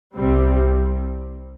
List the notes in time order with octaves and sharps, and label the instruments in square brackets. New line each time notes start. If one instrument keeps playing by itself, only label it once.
[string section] C2 C3 G3 C4